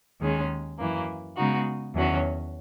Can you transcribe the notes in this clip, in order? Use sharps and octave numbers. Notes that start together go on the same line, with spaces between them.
D#2 D#3 G#3 C#4 G#4
F#2 E3 A#3
C#3 G#3 B3 D#4 F#4
E2 D#3 F#3 C#4 F#4